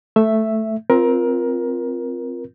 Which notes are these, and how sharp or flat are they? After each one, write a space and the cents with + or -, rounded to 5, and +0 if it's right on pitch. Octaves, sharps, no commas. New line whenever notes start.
A3 +0 E5 +5
C4 +0 F4 +0 A#4 +20